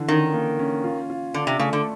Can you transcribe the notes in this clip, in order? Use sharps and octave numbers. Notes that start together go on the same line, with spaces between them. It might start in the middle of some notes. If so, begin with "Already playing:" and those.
Already playing: D3 E3
D#3 C#4
A#3
C#4
F4
F4
D3 D4
C3
C#3 A3
D3